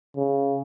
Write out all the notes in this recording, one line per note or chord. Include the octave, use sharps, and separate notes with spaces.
C#3